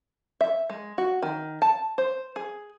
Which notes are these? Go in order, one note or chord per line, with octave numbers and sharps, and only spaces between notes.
E5
G#3
F#4
D#3
A5
C5
G#4